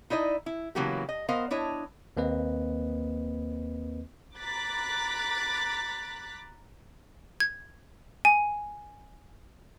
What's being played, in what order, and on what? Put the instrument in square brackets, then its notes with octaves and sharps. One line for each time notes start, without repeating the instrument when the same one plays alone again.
[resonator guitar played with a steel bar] D#4 E4 D5 D#5
E4
C#3 E3 F#3 A#3 B3 G4
D#5
B3 A#4 C5 D#5 F5
D4 E4 C#5 D#5
[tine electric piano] D#2 A#3 C4 B4 D#5
[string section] A#5 B5 D6 F#6 A6 B6
[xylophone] G#6
G#5